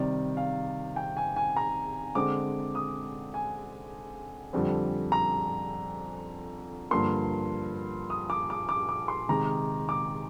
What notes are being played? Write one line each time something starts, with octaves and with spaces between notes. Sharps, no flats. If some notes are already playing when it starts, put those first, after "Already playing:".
Already playing: C3 D#3 G3 C4 D5
F5
G5
G#5
G#5
A#5
D3 G#3 C4 D6
D#6
G#5
F2 D3 G3 C4
A#5
G2 D3 F3 A#3 C6
D#6
D6
D6
D6
D6
C6
C3 D#3 G#3 A#5
D6